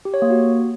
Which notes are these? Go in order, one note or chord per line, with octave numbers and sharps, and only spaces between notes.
G4
C#5
A#3
F#4